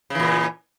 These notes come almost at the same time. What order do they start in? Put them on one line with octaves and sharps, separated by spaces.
C#3 E3 A#2